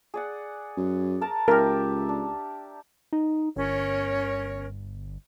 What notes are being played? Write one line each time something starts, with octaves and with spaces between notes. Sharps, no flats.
G#4 D5 F#5
F#2
A#4 A5 A#5
C#2 G4 A#4 E5
D4
D#4
G1 C#4 A#4 C#5